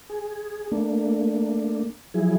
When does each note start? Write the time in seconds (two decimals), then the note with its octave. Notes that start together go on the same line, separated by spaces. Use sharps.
0.09 G#4
0.72 A3 A#3 D4
2.14 F3 F#3 E4 G#4